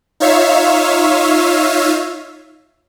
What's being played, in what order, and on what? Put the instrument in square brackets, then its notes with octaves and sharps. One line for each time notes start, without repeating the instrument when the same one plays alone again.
[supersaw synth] D#4 F4 C#5 E5 F5